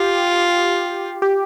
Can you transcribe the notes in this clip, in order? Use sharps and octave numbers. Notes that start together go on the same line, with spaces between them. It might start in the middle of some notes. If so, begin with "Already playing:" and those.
Already playing: F4 G4
G4